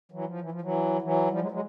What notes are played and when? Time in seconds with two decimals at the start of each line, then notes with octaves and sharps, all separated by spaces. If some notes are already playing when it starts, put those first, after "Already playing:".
0.12 E3 F#3
0.26 F3
0.41 E3
0.51 F3
0.61 E3 F#3
1.02 E3 F#3
1.31 F3 G3
1.41 F#3 G#3
1.51 F#3 G#3